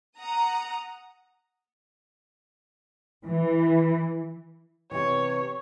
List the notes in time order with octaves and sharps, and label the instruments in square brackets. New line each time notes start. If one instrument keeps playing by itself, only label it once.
[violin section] F#5 A#5 D#6
[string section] E3
[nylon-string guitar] C3 E3 [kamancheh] C#5